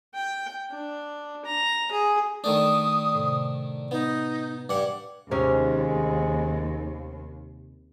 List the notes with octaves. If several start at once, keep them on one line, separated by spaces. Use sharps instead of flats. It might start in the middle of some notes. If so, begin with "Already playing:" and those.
G5
D4
A#5
G#4
D#3 A3 D4 D#6
A2 C3
B3 D#4
G2 F#5 D6
D#2 C3 G#3 C#4 A#4 C5